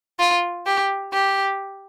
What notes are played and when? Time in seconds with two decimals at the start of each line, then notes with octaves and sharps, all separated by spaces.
0.19 F4
0.66 G4
1.13 G4